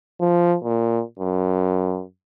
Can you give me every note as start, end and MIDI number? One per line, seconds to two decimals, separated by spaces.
0.20 0.56 53
0.64 1.03 46
1.19 2.03 42